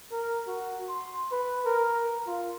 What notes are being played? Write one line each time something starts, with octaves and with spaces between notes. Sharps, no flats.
A#4
F#4
C6
B4
A#4
F4